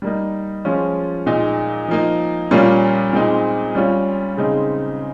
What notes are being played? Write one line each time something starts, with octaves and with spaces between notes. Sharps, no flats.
G3 A#3 D#4
F3 G#3 C#4 F4
A#2 G#3 D#4
F3 A#3 D#4
A#2 G3 A#3 C#4 F4
A#2 G#3 C4 D#4
G3 C#4 F4
C#3 G#3 C4 D#4